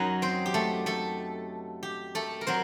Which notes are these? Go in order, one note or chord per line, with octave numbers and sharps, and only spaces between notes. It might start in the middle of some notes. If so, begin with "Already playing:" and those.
Already playing: F#2 F#3 D#4 D#5
C4 C5
G4
A3 A4
A3 A4
G4
A3 A4
A#4
F#3 C4 C5